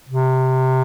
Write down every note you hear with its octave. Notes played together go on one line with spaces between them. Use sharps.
C3